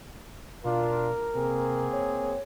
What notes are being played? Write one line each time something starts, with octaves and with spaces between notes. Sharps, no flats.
B2 D4 F4 A#4
C3 A#3 C4 G#4
C#5